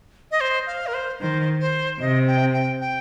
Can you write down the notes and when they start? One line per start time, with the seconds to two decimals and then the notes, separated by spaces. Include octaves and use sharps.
0.31 D#5
0.41 C5
0.67 F5
0.87 A#4
0.94 C5
1.20 D#3 C5
1.60 C5
2.00 C3 D#5
2.27 G5
2.53 G5
2.81 G5